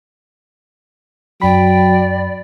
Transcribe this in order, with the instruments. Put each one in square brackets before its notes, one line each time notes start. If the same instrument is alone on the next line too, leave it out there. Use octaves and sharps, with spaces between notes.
[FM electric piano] F#2 B5 [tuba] F#3 [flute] D5 [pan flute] G5